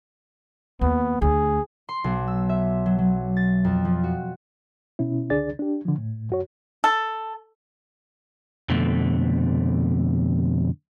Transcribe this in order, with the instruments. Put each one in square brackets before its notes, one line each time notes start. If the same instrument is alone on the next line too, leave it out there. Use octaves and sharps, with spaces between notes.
[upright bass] D#2 [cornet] B3
[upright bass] D2 [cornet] G#4
[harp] C6
B1
E6
E5
F#3
F#3
A6
F2
F3
F#4
[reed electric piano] B2 C#4 E4
C#2 D3 D4 G#4 D5 A6
D4 G4
D3 F3
A2
F#2 F#4 C#5
[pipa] A4
[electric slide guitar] F2 B2 D3 A3